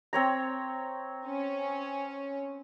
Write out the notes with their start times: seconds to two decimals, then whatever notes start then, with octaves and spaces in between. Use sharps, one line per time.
0.13 C4 C#5 A#5
1.27 C#4